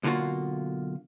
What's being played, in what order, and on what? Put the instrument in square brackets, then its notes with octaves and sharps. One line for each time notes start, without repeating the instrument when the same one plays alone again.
[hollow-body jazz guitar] B1 D3 A#3 F4 F#4